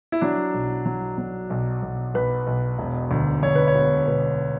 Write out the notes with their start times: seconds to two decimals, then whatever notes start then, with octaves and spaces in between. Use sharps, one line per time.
0.12 E4
0.21 F#3 D4
0.54 B1
0.86 F#3
1.18 F#3
1.50 B1
1.82 B1
2.14 B1 B4
2.47 B1
2.79 E1
3.11 D2
3.43 D2 C#5
3.55 B4
3.68 C#5
3.75 E1
4.07 E1 B4